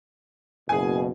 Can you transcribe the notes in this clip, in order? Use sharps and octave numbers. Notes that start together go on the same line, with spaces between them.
F#1 B2 G#4 G#5